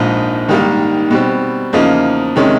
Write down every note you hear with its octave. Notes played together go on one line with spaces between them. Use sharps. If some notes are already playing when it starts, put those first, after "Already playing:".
Already playing: A#1 G#2 F3
G#2 D#3 G3 A#3
B2 G3 C4
E2 C#3 F3 A#3 D#4
C3 D#3 G#3 C#4